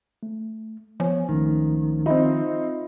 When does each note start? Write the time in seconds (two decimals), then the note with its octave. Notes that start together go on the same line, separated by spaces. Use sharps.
0.23 A3
1.00 F3 B3 C#5 G#5
1.29 C#2 D#3 A3 C#4
2.06 C4 D#4 F4 E5 B5